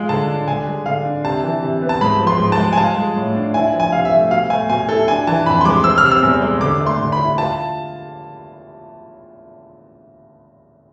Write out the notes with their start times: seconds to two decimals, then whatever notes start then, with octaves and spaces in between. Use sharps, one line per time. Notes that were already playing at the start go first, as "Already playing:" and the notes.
Already playing: G#3 F4
0.09 D3 A5
0.29 D4
0.48 D3 G#5
0.67 G#3
0.86 D3 F5
1.05 D4
1.24 C3 A5
1.44 E3
1.63 C3
1.82 B3
1.89 A5
2.01 G#2 B5
2.20 F3
2.27 C6
2.39 G#2
2.52 A5
2.58 G#3
2.73 G#5
2.78 F4 A5
2.97 G#3
3.16 A2
3.35 D4
3.54 E4 G#5
3.74 F3
3.80 G#5
3.92 C3 F5
4.05 E5
4.12 A3
4.31 B2 F5
4.50 A3 G#5
4.69 B2 G#5
4.89 E4 A4
5.08 D4 G#5
5.27 E3 A5
5.46 F2 B5
5.61 C6
5.65 G#3 D6
5.84 C4 E6
5.98 F6
6.04 C3
6.11 E6
6.23 E2
6.42 G#3
6.61 D3 D6
6.80 A3
6.87 C6
7.00 D3
7.12 B5
7.19 E4
7.37 F4 A5